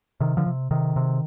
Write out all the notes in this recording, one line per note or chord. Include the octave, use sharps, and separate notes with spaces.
C3 D#3
D3 F3
C3
C3 D#3
C3